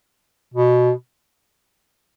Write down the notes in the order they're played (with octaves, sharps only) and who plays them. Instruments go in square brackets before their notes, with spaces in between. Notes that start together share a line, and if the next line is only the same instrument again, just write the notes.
[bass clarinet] B2